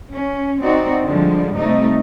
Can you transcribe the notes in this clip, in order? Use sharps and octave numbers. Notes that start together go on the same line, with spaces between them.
C#4
C4 D#4 F#4 D5
D3 F3 G3 G#3
C3 G3 A3 D#4